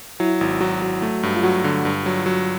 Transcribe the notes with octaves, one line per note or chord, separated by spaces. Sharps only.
F#3 E4
G#1
F#3 F#4
F#3
A3
G2
F4
F#3 F#4
D3
G2
F#3
F#3